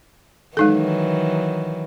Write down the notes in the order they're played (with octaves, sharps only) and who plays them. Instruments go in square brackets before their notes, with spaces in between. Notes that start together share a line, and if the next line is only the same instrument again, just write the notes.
[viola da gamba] D#3 E3 F#3 [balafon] G#3 D#4 A4